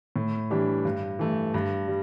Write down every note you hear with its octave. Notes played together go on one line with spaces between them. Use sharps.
A2
E3 G3 D4 G4
G2
E3 A3
G2
G3